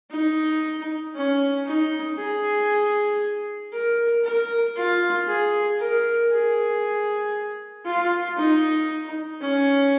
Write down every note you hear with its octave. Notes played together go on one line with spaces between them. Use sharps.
D#4
C#4
D#4
G#4
A#4
A#4
F4
G#4
A#4
G#4
F4
D#4
C#4